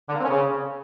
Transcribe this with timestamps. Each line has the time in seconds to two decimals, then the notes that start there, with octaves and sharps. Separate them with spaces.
0.09 D3
0.14 A#3
0.19 C4
0.25 C#4
0.30 C#3